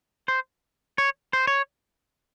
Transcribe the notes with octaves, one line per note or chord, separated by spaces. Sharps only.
C5
C#5
C5
C#5